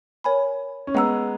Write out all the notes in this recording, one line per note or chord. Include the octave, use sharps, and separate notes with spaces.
A#4 C#5 G#5 B5
C#4
G#3 B3 D#5 F#5 A#5 E6